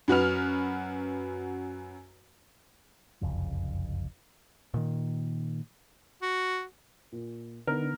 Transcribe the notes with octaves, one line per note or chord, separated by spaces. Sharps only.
F#2 F#4 B4 F6
F#1 C2 F2 C#3
A#2 D#3
F#4
A#2
D3 B3 D#4 A#4